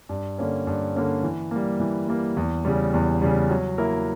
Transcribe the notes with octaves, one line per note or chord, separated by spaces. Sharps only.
G2
D3 A#3 C#4
G2
D3 A#3 C#4
E3
G3 A#3
E3
G3 A#3
E2
C#3 G3
E2
C#3 G3
F#3
A#3 E4 A#4